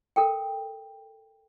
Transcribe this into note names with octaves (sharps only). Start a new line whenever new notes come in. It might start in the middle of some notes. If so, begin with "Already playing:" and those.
A4 A#4 G5